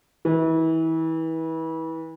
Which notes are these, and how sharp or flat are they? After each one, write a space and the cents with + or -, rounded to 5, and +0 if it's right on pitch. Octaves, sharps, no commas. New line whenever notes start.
E3 -30